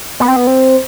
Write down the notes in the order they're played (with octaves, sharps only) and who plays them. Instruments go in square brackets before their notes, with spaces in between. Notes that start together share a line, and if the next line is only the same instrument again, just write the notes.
[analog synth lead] B3
C4
B3
C4